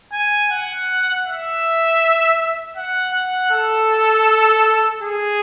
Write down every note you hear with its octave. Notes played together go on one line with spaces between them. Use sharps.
G#5
F#5
E5
F#5
F#5
A4
G#4